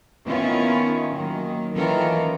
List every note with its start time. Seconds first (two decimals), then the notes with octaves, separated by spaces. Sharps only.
0.24 D#3 B3 C#4 E4 F4
1.13 D#3 F#3 A#3
1.75 D#3 E3 C#4 F4 A4 A#4